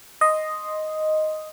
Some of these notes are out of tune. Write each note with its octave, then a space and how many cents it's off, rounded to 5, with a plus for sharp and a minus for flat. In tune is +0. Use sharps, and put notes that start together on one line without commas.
D#5 +0 C6 +0